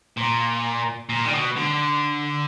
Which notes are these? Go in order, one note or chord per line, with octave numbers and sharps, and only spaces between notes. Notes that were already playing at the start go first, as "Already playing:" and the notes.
A#2
A#2
D3
B2
D3